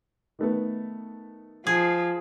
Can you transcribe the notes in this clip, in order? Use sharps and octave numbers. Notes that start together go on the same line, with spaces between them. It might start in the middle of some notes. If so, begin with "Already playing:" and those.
D#3 A3 B3
F3 G#4